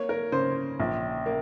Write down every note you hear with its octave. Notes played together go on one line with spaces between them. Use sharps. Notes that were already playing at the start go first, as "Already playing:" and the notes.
Already playing: A#3 C#5
A#4
C#3 C5
A#1
A#3